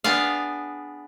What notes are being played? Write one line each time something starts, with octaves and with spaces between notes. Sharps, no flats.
B3 D4 G#4 F5